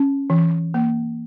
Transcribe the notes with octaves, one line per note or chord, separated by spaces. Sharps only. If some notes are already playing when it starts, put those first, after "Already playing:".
Already playing: C#4
E3
A#3